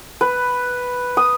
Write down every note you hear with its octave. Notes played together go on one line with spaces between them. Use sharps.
B4
D#6